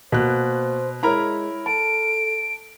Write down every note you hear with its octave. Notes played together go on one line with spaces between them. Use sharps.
B2 A#3 F#4 C5 F#6
G#3 E4 A#4 C#5 A#5 B5
A4 A5 D7